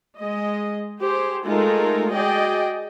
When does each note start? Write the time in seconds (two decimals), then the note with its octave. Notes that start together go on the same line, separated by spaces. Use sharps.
0.18 G#3 D#5
0.99 G4 G#4 C5
1.45 G#3 A3 D#4 F4 A4 A#4
2.10 F#4 G#4 D5 D#5 G5